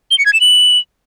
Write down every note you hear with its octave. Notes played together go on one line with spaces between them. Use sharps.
G7
C#7
G#6
E7
F#7